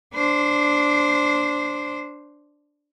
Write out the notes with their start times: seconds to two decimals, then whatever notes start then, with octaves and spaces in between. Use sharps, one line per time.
0.14 D4 C5